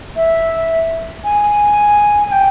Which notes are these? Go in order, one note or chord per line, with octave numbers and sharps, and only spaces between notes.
E5
G#5
G#5
G5